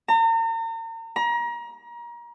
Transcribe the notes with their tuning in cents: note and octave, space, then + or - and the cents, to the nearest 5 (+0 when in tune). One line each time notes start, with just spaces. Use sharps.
A#5 -40
A#5 +30